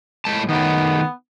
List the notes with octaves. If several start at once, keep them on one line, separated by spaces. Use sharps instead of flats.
A2 G#3 A5
D#3 A3 B3